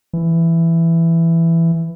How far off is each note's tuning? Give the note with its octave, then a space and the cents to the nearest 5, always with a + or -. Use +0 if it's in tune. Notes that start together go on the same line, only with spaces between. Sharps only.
E3 +10